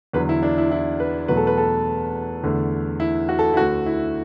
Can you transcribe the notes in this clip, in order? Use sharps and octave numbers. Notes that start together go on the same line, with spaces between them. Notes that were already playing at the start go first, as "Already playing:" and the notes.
E2 D3 F#3 B4
E4
D4
E4
E4
B4
E2 B2 F#3 A3 B4
A4
B4
A4
E2 D3 A3
E4
F#4
A4
E4
D2 D3 A3 F#4
E4